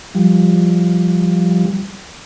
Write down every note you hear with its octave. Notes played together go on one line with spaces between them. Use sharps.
F3 G3